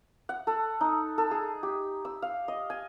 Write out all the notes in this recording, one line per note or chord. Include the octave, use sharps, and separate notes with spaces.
F#5
A4
D#4
A4
G#4
G4
E6
F5
D#5
G#5